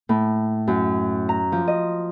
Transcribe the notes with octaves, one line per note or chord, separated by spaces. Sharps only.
A2
F#2
A#5
F3
D#5